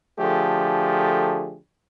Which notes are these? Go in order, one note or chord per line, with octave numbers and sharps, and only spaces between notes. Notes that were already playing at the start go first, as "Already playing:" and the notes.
D3 F3 A3 G4 G#4